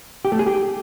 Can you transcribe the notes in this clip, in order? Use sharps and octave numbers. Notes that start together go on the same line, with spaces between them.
G4
A3
G#4
G4